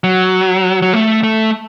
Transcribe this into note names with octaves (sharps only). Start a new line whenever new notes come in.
F#3
F#3
A3
A3